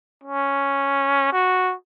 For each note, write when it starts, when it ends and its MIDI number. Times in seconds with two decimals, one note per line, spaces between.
0.23 1.32 61
1.33 1.73 66